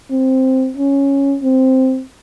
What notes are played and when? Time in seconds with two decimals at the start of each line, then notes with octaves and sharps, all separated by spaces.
0.11 C4
0.77 C#4
1.43 C4